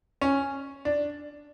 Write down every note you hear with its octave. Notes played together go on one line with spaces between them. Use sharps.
C#4
D4